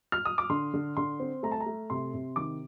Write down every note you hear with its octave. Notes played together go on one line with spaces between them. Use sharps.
F6
D#6
D6
D3 C6
D3
D3 C6
C4
A3 A#5
A5
A#5
A3
C3 C6
C3
D#3 D6